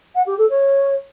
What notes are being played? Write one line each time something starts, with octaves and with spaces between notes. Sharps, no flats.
F#5
G4
A4
C#5